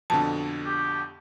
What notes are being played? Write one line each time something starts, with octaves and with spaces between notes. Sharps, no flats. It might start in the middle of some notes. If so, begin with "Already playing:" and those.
F2 B2 D3 A5
G4